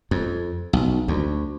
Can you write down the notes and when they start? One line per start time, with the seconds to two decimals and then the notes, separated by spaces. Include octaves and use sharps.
0.11 F2
0.73 B1
1.08 D2